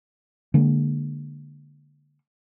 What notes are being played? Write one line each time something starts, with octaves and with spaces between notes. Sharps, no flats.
D3 G#3 A#3